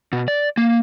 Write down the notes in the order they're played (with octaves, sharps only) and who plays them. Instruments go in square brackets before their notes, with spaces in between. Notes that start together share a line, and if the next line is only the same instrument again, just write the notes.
[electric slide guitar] B2
D5
A#3